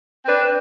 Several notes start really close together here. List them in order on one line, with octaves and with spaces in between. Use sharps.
C4 B4 D4